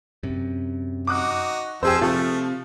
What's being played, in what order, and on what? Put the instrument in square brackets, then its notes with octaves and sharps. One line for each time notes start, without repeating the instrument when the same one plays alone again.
[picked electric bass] F#2 C3
[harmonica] D#4 F#4 [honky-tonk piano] D6 D#6 F#6
[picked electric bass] F2 [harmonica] F3 E6 [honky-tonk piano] G4 G#4 C5
[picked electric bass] C3 [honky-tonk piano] F3 [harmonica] A3